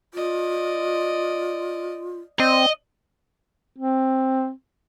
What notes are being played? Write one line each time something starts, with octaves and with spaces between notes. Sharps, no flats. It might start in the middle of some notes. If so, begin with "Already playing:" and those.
F4 D5 D#5
C4 D5 D#5
C4